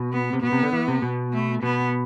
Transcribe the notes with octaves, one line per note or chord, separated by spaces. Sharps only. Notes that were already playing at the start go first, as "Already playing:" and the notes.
Already playing: B2
B3
C3
B2 B3
C3
D3
E3
C3
B2
A3
B2 B3